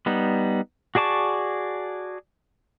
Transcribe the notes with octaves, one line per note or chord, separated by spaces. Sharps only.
G3 B3 D#4
F#4 G#4 D5 A5 C#6